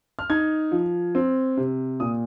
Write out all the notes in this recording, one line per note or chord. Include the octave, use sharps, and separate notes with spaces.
F6
D#4 G#6
F3
C4
C3
A#2 D#6